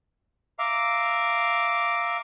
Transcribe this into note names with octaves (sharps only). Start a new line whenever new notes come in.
E5 F5 A#5 D6